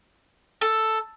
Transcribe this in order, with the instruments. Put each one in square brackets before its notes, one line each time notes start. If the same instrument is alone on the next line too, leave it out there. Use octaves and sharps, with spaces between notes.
[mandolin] A4